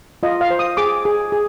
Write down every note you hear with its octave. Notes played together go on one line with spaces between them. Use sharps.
F4 D#5
F5
C5
D#6
G#4 D6
G#4
G#4